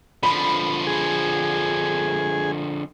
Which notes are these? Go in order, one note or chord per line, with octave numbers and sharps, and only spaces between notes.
D3 F3 B5
G#4